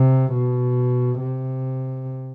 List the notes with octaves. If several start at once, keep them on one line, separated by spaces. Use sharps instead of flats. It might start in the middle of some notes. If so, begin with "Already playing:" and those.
Already playing: C3
B2
C3